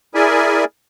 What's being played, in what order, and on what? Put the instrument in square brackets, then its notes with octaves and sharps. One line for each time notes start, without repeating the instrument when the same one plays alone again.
[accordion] E4 G#4 A#4 D5 E5 G#5